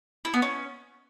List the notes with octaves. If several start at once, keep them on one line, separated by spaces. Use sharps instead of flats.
E4
B3
C#4